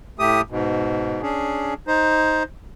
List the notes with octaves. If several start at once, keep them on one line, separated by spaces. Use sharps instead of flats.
A2 A3 G4 D#6
G#2 B2
C#4 D4 G#4
D#4 C5